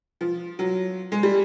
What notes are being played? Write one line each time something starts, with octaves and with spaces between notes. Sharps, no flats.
F3
F#3
G#3
G3